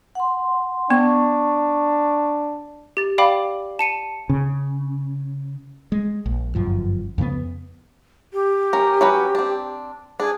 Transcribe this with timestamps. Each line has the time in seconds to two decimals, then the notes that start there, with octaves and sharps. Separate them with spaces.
0.15 F#5 C6
0.90 B3 D4 C#6
2.97 G4 A6
3.18 D5 F5 G5 B5 D6
3.79 A5 C#7 D#7
4.30 C#3
5.92 G#3
6.26 A#1
6.55 G1 F#2 F3
7.18 F2 C#3 A#3 B3
8.33 G4
8.73 C#4 A#4
9.01 F#3 C#4 B4
9.35 C4 D4
10.20 D4 G#4